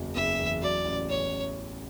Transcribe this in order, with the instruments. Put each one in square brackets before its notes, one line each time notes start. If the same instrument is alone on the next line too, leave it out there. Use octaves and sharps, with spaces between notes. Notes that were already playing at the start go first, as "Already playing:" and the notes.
Already playing: [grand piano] F#1 E2 F#3
[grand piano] F#1 [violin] E5
[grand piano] E2
[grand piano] F#3 [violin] D5
[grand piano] A1
[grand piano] A1 [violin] C#5